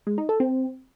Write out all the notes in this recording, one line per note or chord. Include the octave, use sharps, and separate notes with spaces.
G#3
D#4
A4
C4